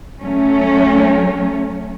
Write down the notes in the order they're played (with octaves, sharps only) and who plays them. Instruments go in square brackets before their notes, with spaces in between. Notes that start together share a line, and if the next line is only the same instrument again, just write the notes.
[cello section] F#3 A3 C#4